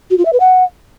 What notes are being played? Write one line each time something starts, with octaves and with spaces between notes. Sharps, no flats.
F#4
F4
E5
B4
F#5